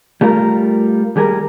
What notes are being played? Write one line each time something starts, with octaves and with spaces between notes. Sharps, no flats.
G3 A3 F4 A#4
D#2 G3 G#4 A#4